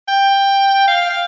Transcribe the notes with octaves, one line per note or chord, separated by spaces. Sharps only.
G5
F5
F5